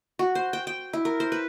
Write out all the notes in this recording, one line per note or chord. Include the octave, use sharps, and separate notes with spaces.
F#4
C5
G5
G5
E4
A#4
C5
B4